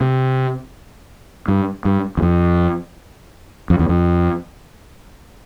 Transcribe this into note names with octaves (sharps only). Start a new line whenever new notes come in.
C3
G2
G2
E2
F2
F2
E2
F2